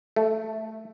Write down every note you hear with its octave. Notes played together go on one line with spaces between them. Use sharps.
A3